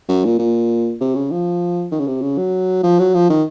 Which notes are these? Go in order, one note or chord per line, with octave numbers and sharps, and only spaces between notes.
F#2
A#2
A#2
C3
C#3
F3
D#3
C#3
C3
C#3
F#3
F3
F#3
F3
D#3